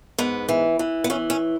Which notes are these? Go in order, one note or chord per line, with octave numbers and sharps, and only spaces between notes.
G#2 B3
E3
E3
B3
E3 C#4
C#4